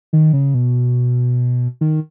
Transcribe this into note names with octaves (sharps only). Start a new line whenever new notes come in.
D#3
C#3
B2
D#3